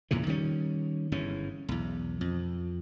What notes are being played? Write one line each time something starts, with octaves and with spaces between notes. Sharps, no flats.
E2 A#2 C#3 E3
D#3 G3 A#3 C#4
G1 G#2 E3 C#4
B1 E2
F2